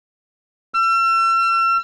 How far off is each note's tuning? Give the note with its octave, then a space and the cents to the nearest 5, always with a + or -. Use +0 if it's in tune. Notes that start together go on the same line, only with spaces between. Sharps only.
E6 +40